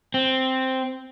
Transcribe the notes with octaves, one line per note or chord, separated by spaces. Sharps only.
C4